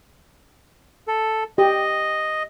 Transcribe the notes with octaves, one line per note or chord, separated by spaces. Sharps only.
A4
G4 D#5